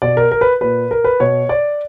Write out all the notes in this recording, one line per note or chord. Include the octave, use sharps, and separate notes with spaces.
B2 D5
A#4
A#4
B4
A#2 B4
A#4
B4
B2 C#5
D5